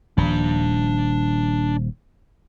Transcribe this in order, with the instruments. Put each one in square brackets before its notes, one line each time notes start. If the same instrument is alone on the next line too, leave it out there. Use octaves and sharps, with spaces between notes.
[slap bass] D#1 F3 [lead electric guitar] D4 B5